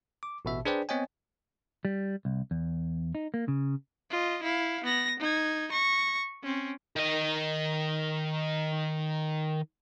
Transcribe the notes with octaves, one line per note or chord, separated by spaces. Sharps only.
D6
A1 B2 E5
D4 G#4 B4 C5 D5 G5
B3 C4 C#5 D#5 G5 G#5
G3
C2
E2
D#4
A#3
C#3
F4 D#5
E4 F5
B3 A#6
D#4 G#6
C#6 A#6
C4 C#4
D#3 D#5